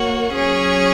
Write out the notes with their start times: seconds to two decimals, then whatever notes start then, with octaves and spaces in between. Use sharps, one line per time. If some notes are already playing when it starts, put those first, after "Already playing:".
Already playing: A#3 F#4 C#5
0.33 F#3 C#4 G#4 C#5